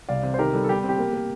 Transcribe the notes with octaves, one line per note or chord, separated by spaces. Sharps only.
C2 D5 F5
C3
C5
D#3 G4 A#4
G3 A4
A4
G3 G4
C4
G4
A#3
A#3